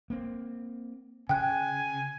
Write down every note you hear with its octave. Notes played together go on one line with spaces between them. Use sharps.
A#3 C4
C#3 G5 G#5 F#6